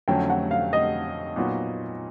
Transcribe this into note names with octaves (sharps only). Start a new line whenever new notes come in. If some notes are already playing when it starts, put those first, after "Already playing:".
F2 D3 F#3 A3 C#4 G5
F#5
F5
D#5
A#2 F#3 B3 D#4 F#4